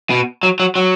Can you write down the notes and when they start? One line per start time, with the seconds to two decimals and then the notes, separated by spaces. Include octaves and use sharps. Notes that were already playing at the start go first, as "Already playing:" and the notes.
0.10 B2
0.43 F#3
0.60 F#3
0.76 F#3